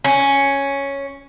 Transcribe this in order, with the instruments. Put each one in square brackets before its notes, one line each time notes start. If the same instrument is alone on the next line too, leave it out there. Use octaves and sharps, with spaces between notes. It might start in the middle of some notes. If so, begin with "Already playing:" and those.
[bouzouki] C#4